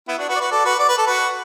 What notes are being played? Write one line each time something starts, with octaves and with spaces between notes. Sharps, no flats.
B3 E4
D4 F#4
F#4 B4
D5
F#4 B4
A4 D5
F#4 B4
D5
B4
A4
F#4 B4